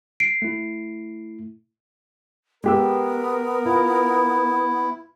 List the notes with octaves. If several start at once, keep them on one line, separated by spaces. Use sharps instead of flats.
C7 D7
A3 E4
G#3 B3 G4 A#4 E6
E4 F4